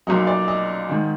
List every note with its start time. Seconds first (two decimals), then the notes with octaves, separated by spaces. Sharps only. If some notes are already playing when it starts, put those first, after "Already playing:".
0.07 B1 A#2 F#3 D#5
0.27 D5
0.48 D#5
0.89 G#2 D#3